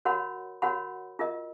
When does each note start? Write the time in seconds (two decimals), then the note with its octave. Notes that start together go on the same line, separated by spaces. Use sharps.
0.05 F#4 A#4 C#5 F#5 B5
0.62 F#4 A#4 C#5 F#5 B5
1.19 F4 A#4 D#5